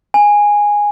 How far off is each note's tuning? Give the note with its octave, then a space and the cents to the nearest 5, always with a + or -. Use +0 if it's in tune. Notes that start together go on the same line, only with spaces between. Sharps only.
G#5 -10